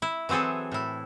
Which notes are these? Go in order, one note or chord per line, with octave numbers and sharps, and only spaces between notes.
E4
E3 F#3 C4 G#4 A4
A2 E4